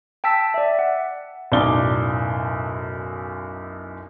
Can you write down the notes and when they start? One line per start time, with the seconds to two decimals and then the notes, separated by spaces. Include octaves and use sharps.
0.24 G5 A5 E6 B6
0.54 D5 E5
0.79 F#5
1.52 B1 F#2 A2 D5 G7